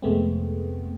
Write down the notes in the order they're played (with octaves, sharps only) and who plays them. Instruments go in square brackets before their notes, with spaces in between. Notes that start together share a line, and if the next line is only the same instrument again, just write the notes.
[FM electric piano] F2 C3 G#3 A3 B3 C4